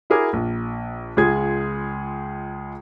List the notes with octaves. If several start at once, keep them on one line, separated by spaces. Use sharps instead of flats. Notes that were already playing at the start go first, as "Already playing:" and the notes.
E4 F#4 G#4 A#4 D6
A#1
C#2 G#3 F4 G#4 G#6